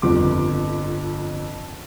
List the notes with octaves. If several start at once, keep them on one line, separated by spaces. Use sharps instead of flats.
G1 F2 F3 D6